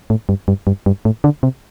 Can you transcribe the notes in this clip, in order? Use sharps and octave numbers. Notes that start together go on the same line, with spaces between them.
A2
G2
G2
G2
G2
A2
D3
C3